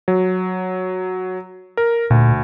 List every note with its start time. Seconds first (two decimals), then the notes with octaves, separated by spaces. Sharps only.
0.08 F#3
1.77 A#4
2.10 D2 A#2